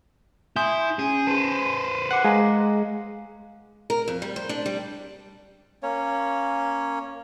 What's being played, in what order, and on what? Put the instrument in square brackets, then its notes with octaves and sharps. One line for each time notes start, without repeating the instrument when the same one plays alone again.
[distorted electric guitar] E4 [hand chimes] G#5 C6 D#6 [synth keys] G6
[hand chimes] C#4 [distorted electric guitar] G#4
[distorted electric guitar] B4 C5 [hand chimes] A5
[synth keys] F#5 [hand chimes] D6 C7
[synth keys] G#3 [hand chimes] F5 A#5
[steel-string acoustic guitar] A#4
F2
G3
C5
D4
G3
[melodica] A#3 C#4 C#5